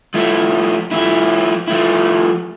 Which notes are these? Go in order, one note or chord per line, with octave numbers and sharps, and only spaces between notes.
F3 A3 E4
F3 A3 E4
F3 A3 E4